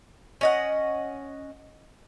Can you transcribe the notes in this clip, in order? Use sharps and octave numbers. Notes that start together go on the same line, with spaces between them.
C#4 D#5 F#5